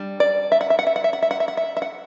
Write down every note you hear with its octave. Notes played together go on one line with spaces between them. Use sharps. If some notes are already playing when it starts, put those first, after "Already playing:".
Already playing: G3 D4
D5
E5
F#5
E5
F#5
E5
F#5
E5
F#5
E5
F#5
E5
F#5
E5
E5
F#5